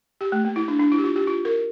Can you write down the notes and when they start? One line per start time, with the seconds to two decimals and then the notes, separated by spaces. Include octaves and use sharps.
0.21 G4
0.32 A3
0.45 A#3
0.56 E4
0.68 D4
0.79 D4
0.92 E4
0.98 G4
1.04 F4
1.16 G4
1.27 F4
1.45 A#4